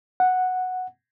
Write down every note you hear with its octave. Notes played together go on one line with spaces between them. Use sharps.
F#5